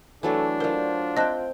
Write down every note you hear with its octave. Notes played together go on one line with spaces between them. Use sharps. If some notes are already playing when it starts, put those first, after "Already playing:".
E3 F#3 A3 D4 A4
F#3 F4 A#4 C5 D5
C4 D#5 G5 A5 F#6